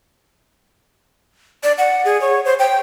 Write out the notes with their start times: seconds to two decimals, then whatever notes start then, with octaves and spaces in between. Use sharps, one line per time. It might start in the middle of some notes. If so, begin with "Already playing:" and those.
1.63 D5
1.78 F#5
2.05 G#4
2.21 C#5
2.45 C5
2.59 G5